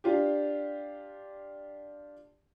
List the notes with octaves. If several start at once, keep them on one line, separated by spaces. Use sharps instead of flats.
D4 F4 G4